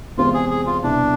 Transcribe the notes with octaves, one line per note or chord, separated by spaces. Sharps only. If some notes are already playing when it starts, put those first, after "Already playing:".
E2 C3 E3 G#3 C4 F4
G#4
G#4
F4
C2 B2 B3 D4 E4